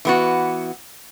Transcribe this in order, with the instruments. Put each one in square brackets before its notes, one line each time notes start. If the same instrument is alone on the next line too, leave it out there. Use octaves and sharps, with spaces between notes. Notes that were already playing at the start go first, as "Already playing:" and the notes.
[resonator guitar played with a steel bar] E3 B3 F#4